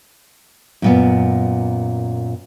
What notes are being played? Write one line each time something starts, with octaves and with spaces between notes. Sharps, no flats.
F#2 A#2 B3